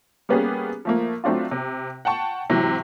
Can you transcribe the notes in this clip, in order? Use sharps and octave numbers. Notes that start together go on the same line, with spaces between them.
G3 A#3 B3 C#4 G4 G#4
F3 A3 A#3
F#3 A3 C4 D4 F4
C3
F#5 G5 A5 C#6
G#2 C3 E3 F#3